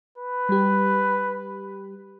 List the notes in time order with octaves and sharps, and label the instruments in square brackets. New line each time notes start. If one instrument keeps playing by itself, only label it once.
[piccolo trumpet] B4
[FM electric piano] G3 G4